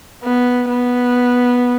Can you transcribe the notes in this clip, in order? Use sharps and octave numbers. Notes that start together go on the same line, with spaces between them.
B3
B3